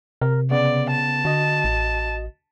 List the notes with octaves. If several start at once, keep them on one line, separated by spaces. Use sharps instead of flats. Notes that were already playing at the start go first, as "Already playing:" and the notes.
C3 A#4
C#3 B3 D5
A5
D3 F#4 D#5
A1